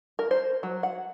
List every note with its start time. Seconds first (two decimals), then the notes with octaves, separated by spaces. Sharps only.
0.19 A#4
0.31 C5
0.63 F#3
0.83 F#5